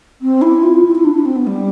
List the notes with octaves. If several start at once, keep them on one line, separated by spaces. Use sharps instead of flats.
C4
E4
F4
F4
E4
E4
D4
D4
C4
B3
G3